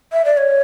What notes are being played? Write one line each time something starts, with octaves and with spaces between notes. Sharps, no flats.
E5
D5
C#5